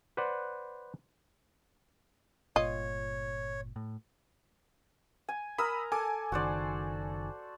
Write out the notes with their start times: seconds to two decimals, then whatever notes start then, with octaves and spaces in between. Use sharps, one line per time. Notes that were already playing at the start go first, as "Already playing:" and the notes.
0.17 B4 C5 D5 F#5
2.56 G1 A#2 F4 C#5 D#5
3.76 A2
5.29 G#5
5.58 A#4 A#5 B5 D#6 E6
5.92 A4 G#5 D6
6.32 F#1 D#3 F#4 C5 D5